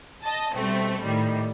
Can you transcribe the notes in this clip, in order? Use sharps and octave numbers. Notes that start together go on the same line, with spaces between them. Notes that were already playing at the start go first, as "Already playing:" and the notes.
D#5 A5
B2 G3 A3 C4
A2 D#3 G3